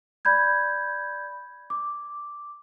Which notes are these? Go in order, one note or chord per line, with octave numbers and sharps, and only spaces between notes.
D5 B5 G6 G#6
D6